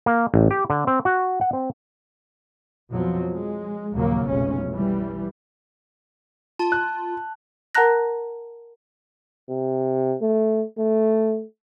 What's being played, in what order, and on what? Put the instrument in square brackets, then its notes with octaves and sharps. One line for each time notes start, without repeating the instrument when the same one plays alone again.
[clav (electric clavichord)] A#3
A1
G4
D3
C4
F#4
F#5
C4
[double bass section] F2 B2 F3 F#3
G#3
A#1 D#2 A#2 C#3 F#3 A#3
F1 B1 G#3 C#4
E3 G3
[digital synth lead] F4 [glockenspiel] A5
[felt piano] F#6
[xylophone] A#4 F#5 A5 A#5 F#6 A#6
[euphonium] C3
A3
A3